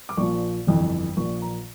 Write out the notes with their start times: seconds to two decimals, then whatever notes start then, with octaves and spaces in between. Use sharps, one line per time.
0.09 D6
0.17 A#1 A#2 F3 C#6
0.67 G1 F2 E3
1.17 A#1 A#2 F3 C#6
1.42 A#5